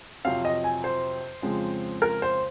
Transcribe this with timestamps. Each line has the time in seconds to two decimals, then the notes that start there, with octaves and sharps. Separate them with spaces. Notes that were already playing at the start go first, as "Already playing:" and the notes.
0.25 F2 C3 F#3 C4 F5
0.45 D#5
0.64 G#5
0.84 C5
1.42 F2 C#3 F3 G#3 C4
2.02 A#4
2.22 C5